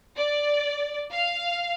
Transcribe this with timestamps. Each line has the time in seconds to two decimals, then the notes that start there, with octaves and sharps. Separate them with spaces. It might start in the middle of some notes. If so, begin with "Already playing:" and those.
0.18 D5
1.12 F5